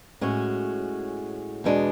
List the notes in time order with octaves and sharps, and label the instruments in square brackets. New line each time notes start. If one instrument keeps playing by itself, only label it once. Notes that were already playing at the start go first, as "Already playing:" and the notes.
[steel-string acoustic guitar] A2 G#3 C#4 F#4
E2 B2 G#3 D4